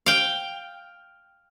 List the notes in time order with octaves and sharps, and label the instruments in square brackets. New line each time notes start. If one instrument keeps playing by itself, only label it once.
[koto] F5 G5